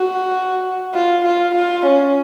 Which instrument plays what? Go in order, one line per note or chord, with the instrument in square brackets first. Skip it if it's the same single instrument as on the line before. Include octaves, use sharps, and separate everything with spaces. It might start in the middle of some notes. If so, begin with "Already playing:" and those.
Already playing: [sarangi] F#4
F4
F4
F4
C#4